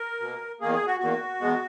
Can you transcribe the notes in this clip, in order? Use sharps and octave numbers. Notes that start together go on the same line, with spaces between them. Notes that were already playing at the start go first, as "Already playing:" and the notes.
Already playing: A#4
B2 A#3
E2 D#3 A#3 G#4
G#4
F#4
E2 D#3 A#3 F#4
E2 B2 G#3 B3